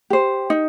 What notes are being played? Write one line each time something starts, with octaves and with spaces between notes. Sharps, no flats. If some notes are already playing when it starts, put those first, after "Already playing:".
G4 C5
D#4